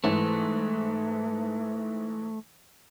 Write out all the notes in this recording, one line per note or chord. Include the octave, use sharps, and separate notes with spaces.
G#2 E3 A3